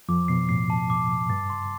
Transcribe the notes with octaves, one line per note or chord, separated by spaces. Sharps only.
F2 F3 D6
B2 C7
A2 C7
A5
D6
D6
G2 A6
C6